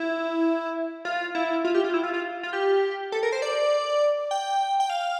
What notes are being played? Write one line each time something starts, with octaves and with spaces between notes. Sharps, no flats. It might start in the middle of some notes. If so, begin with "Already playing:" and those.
Already playing: E4
F4
E4
F4
G4
F4
E4
F4
F4
F4
G4
A4
A#4
C5
D5
G5
G5
F5